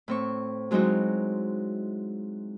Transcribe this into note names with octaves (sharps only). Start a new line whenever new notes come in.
A2 C4 C#6
F#3 G#3 C4 D#4 E4 F#4